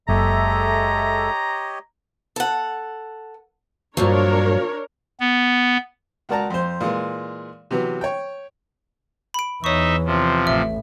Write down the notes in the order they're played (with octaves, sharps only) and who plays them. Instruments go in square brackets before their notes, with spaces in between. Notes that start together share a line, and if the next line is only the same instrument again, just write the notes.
[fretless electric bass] F#1 [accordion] G#3 A4 E5 [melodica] G4 C#5 D#5 [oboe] A#5
[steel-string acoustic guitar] A4 F#5
[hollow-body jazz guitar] D2 G2 [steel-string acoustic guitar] A#2 F3 F#3 [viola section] D4 A#4 C#5
[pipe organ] B3
[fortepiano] C#2 F#4 A#4 D5 A5 A#5
F2 C5
A#2 E3 G#3
C3 E3 F#3 B3
C#5 G5
[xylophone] B5 D7
[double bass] E2 E3 [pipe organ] D#4 E5 [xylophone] C#5 C#6
[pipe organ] C3 F3
[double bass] A1 A2 [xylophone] E5